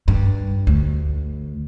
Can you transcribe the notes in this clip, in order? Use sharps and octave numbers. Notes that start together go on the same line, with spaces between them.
G2
D2